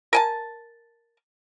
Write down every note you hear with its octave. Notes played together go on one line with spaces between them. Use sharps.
A#4 G#5 A5